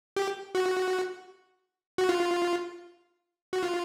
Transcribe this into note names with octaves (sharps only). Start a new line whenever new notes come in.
G4
F#4
F#4
F4
F#4
F4